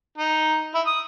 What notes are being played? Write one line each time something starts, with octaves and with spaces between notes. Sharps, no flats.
D#4
E4
D#6